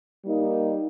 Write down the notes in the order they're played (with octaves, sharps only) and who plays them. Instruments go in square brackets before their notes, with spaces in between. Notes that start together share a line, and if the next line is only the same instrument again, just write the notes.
[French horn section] G3 A#3 D#4